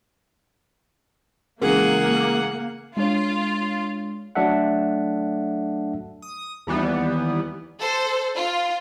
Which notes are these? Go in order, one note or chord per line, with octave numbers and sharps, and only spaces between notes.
C#3 E3 G#3 A#3 G#4 A#4 F#5
G#3 D4 F4 C#5
F#3 A3 D4 A4 E5 F#5
D#6
D#2 E3 G3 B3
A4 C5
F4